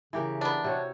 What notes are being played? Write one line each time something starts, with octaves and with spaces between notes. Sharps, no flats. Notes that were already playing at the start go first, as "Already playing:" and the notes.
C#3 E3 G4 A#4
B3 D4
C3 F#4 C#5